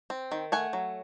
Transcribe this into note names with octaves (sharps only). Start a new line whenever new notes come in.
C4
D#3
A3 F#5 G#5
F#3